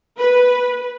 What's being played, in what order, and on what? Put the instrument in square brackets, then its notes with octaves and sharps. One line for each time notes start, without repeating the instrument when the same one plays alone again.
[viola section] B4